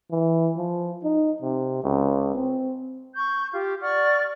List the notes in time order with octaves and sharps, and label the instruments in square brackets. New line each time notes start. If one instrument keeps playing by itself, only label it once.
[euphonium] E3
F3
D#4
C3
C#2
C4
[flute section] C#6 G6
F4 G4
D5 F#5 C#6 F6